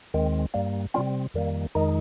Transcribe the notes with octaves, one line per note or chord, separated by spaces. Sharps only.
D#2 D#3 G#3 C4
G2 G3 A#3
C3 G3 C4 C#4 F4
F2 D#3 G3 A#3
F2 D#3 G#3 D#4